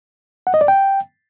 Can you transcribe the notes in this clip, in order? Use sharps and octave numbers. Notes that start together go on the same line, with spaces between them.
F#5
D#5
D5
G5